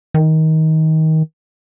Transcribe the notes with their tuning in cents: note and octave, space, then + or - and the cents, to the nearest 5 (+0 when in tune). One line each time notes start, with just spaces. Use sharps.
D#3 +25